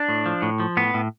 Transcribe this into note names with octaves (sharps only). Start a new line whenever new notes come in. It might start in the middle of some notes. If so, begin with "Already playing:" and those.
Already playing: D4
A2
F3
A2
F3
A2 B3
A2